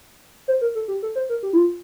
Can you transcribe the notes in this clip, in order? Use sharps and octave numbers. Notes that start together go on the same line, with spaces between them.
C5
A#4
A4
G4
A4
C5
A#4
G4
E4
F4